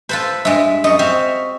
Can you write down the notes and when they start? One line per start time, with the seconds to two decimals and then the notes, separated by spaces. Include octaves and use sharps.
0.09 F4 A4 B4 C5
0.45 G2 G#3 E5
0.84 F#2 D#5 C#6
0.99 C4 E5 F5